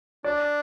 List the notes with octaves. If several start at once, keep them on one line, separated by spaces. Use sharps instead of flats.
D4 D5